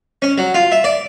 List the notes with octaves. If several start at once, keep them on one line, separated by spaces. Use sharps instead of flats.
C#4
F#3
F4
E5
D5